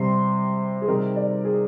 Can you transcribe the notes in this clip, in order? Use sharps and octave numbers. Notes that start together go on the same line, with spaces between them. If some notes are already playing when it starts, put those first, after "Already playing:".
Already playing: C3 G3 C4 C6
G#4
C3 D#3 G3 C4 D#4 A#4
D5
G#4